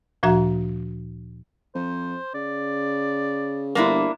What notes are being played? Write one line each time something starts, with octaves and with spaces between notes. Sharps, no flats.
D2 A#2 F3 F#4 E5 A#5
F2 C5
C#3 D5
G1 A#3 D4 E4